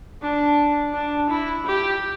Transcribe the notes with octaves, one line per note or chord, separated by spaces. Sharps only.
D4
D4
E4
G4